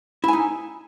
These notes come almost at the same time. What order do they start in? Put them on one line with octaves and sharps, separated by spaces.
E4 G#5 D#4